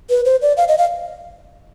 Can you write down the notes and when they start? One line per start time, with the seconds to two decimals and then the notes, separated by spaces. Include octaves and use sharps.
0.10 B4
0.25 C5
0.42 D5
0.57 F5
0.68 D#5
0.78 F5